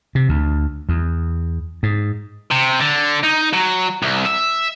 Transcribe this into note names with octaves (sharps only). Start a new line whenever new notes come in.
C3
D2
E2
G#2
C3
D3
D#4
F#3
C2
E5